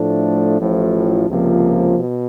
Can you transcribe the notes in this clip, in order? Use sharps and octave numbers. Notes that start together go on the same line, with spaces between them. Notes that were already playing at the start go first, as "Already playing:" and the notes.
Already playing: A2 F3 A3 D4
A1 A2 F3
C#2 C3 F3 A#3
B2